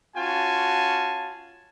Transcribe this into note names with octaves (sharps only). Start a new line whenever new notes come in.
C#4 F4 F#4 G#5 A5